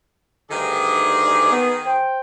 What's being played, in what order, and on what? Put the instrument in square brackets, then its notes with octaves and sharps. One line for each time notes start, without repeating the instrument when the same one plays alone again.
[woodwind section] D2 G2 D6 [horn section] D#3 G#4
[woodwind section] B3
C5 G5